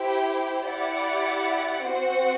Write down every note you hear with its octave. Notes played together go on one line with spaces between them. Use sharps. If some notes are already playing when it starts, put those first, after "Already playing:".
Already playing: E4 G4 C5 G5
E4 G4 D5 F#5
C4 F#4 C5 F#5